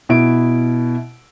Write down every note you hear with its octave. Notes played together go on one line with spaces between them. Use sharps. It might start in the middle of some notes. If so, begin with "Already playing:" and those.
B2 E4 D7